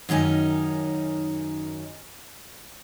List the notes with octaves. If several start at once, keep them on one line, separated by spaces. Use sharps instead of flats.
F#2 D#3 C#4 D#4 G#5